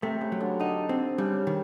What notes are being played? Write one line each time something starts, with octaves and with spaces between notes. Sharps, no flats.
C3 A3
C#3
F#3
D3
D3 D#4
C4
C#3 G3
D#3